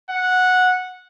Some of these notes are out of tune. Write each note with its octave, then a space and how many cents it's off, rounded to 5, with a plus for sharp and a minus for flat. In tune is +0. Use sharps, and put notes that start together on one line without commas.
F#5 -10